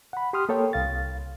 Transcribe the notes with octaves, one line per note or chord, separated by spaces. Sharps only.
F#5 B5
G4 C6 D#6 F6
A#3 A4 C#5 G5
C2 F5 A6